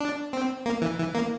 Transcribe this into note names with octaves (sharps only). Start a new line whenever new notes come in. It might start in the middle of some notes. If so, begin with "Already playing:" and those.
D4
C4
A#3
E3
E3
A#3